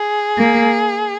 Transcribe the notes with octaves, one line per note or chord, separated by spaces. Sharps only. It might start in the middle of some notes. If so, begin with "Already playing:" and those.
Already playing: G#4
A#3